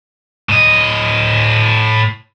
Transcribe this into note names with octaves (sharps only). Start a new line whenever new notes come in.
A2 D#5